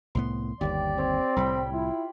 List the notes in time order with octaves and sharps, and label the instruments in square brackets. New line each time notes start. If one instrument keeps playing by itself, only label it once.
[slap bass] C2 A2 B3 [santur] C6
[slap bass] G1 D#2 [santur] G4 [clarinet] D5
[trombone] C4 [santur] C#5
[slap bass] C2 A2 [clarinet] G3 [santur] G5 B5
[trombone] E4 [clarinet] F4